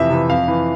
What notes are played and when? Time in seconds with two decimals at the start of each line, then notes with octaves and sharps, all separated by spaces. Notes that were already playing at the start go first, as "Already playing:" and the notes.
Already playing: F2 C3 E3 E5
0.10 C3 E3
0.29 F2 F5
0.48 E3